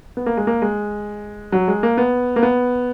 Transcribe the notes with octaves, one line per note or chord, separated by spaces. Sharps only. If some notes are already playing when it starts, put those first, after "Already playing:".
B3
A#3
G#3
A#3
G#3
F#3
G#3
A#3
B3
A#3
B3